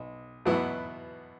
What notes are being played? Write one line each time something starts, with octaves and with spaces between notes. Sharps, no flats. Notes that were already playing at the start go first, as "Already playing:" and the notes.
Already playing: B1
E2 B2 F#3 B3 E4